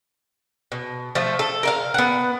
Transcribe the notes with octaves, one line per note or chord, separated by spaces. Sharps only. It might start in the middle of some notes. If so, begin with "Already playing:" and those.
B2
F3 A3
A4
A#4 E5 F5
B3 F#5